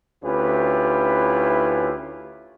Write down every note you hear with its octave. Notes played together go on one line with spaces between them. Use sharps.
D2 C#4 E4 F4 G4 B4